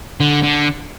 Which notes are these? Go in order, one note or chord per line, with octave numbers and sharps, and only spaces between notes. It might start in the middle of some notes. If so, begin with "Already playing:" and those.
D3
D3